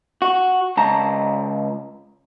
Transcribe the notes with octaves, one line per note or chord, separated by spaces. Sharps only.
F#4
C#2 A5 A#5